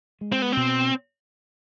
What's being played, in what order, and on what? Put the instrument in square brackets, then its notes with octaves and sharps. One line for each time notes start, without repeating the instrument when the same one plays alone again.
[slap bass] G#3
[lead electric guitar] C4
B3
[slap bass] B2 [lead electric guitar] C4